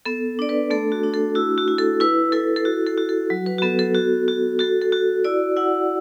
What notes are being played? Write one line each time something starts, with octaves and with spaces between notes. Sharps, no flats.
B3 A4
D4 D5
B4
A3 A4
F#4
D4
A4
E4 F#4
F#4
E4
A4
E4 B4
E4 A4
A4
F#4
A4
F#4
A4
F#3
B4
F#4
B3 A4
A4
F#4
F#4
F#4 A4
A4
F#4
E4 D5
E4 F#5